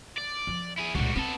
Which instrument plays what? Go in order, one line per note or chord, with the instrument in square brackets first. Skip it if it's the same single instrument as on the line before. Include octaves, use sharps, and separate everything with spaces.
[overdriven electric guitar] D5
[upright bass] F3
[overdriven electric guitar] E4 G#4
[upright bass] C#2 A#2 [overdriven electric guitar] G3 F#4
[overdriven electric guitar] B3 A4 [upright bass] C4